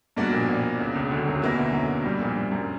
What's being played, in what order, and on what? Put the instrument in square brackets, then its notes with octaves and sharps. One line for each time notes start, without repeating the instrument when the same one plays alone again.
[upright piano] G2 [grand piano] B2 A#3 D4 F#4
[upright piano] A#1 A#2
A#1 A#2
C#2 C#3
C#2 C#3
D2 D3
F#2 F#3
[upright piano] E2 E3 [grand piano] B2 A#3 E4
[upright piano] D2 D3
F#2 F#3
G2 G3
A#1 A#2
G2
F#2